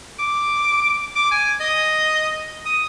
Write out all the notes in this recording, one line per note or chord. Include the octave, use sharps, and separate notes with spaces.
D6
D6
G#5
D#5
D#6